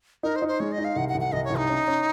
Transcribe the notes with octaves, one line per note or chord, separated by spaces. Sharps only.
D#4 A#4
C5
D#4
C5
G#3 C#5
D#5
D#4
F5
C2 F#5
F#5
C2
F#5
C2 D#5
C#5
C2
D#4
C#4
C#4